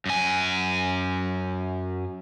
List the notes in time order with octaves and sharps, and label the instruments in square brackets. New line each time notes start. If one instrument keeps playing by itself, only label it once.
[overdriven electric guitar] F#2 G#5